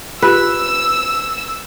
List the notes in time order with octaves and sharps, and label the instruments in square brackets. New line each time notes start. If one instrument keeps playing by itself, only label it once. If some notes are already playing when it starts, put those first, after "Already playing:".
[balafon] F4 G4 [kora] B4 [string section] E6